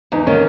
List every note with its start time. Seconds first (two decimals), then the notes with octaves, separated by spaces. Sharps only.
0.12 E2 D#4
0.27 D#3 A#3 C#4